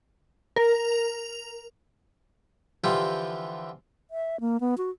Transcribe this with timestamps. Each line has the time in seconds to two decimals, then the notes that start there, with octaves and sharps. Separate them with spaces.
0.56 A#4
2.84 D3 E3 F3 F4 G4 G5
4.11 E5
4.40 A#3
4.60 B3
4.78 F#4